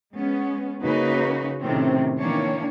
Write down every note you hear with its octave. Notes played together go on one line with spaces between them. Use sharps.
G#3 B3 C#4
C#3 A#3 C#4 D#4 F#4 B4
A2 C3 D#3 C4 C#4
D#3 E3 A#3 C#4 D4 C#5